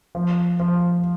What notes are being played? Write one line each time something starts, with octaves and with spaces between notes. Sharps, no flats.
F3
F3